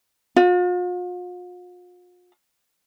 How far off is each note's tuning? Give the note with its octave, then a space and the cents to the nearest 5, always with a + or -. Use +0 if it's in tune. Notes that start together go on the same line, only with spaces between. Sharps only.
F4 +45